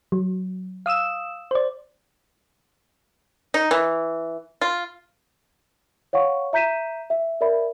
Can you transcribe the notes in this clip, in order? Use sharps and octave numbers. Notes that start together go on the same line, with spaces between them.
F#3
F5 D#6 E6 E7
C5 D5
D#4
E3
F4
C#5 F5 F#5 C#6
E5 A#5 G6 B6 D#7 E7
E5
A#4 D5 E5 B5